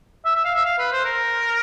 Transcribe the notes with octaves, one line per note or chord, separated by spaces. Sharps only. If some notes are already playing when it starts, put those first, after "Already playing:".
E5
E5
F5
E5
F5
B4
C5
A#4